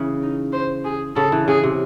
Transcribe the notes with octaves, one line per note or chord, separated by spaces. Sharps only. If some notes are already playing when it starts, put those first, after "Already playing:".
Already playing: C#3 E3
D#4
C5
G#4
C#3 A4
E3
C#3 G#4
C3